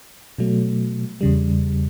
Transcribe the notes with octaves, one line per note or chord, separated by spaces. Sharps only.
B2 F#3 A3
E2 C#3 G3